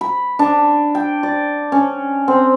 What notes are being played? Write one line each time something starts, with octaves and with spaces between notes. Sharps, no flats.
B5
D4
G5
D5
C#4
C4